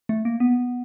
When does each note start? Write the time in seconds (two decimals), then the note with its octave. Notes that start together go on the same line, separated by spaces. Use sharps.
0.09 A3
0.25 A#3
0.40 B3